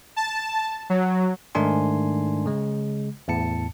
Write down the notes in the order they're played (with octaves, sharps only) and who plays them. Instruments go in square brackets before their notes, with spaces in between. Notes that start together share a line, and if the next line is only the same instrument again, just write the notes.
[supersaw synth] A5
F#3
[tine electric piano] G#2 D#3 A3 D4 G#5 C6
C#3 G#3
E2 A2 A5 C#7